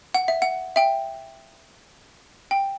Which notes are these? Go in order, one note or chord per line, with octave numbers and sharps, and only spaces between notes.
F#5
E5
F#5
E5 G5
G5